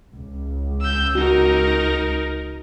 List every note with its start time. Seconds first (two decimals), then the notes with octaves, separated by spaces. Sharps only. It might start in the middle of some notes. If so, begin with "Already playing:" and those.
0.14 C#2
0.81 E6 G6
1.15 D#4 F#4 A#4